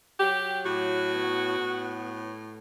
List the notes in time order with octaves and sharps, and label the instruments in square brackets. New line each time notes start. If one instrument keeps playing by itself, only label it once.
[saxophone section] F#3 G4
A2 F#4
B3
A2